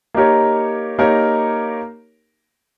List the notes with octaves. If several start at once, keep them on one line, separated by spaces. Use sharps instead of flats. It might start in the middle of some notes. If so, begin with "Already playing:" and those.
A#3 D#4 G4 A#4 C#5
A#3 D#4 G4 A#4 C#5